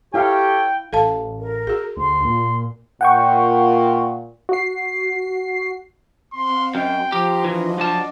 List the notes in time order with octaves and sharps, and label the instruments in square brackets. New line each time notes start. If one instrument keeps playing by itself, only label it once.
[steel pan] E4 F5 [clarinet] G4 [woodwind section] A4 C#5 [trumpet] G5
[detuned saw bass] A1 [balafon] A4 F5 A5
[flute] A#4
[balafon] F#4 G#4
[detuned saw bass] D2 [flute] C6
[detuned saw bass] A#2
[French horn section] A#2 [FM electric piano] F#5 G5 C#6
[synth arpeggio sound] F#4 C7
[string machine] C4 F5 F#5 [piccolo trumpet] C6
[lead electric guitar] F#2 [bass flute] D#5 [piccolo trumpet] G5 [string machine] C6
[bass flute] F3 [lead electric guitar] G4 [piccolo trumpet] A#5
[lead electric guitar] E3 [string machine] D4 F#4 D#5
[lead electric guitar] F#3 A5 [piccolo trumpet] D5